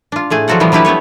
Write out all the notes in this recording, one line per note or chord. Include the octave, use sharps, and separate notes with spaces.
D4 F4
A2 A3 G#4
D3 F3 F#3 F#4 A4 F#5
E3 F3 G3 B3
F#3 G3 D4 E4 G4 B4
A3 B3 B4 C#5